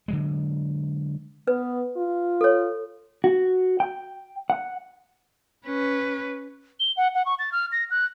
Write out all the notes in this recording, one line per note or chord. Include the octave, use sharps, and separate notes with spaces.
D3 F#3 G#3
B3 B4
F4
A4 C#5
F#4
G5
F#5
C#4 B4
G7
F#5
F#5
C#6
A6
F6
A#6
F#6